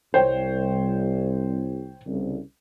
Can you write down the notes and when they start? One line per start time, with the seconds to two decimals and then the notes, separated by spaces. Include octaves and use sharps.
0.14 C2 C5 C#5 G5
2.07 C2 C#3